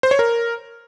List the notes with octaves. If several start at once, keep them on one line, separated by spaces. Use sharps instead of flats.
C5
C#5
A#4